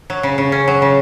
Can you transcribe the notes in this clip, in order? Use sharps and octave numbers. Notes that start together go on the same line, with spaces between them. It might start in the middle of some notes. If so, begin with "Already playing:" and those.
F#3
C#3
C#3
C#4
F#3
C#3